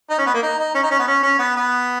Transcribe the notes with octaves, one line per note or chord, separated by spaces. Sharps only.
D#4
C#4
B3
A#3
D#4
D#4
C#4
D#4
C#4
B3
C#4
C#4
B3
B3